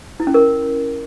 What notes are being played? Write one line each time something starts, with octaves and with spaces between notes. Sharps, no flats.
E4
C#4
A#4